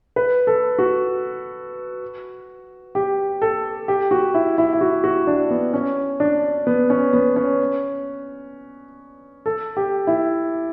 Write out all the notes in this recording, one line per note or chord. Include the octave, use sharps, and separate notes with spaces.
B4
A4
F#4
G4
A4
G4
F#4
E4
E4
E4
F#4
F#4
D4
B3
C#4
D4
B3
C#4
B3
C#4
A4
G4
E4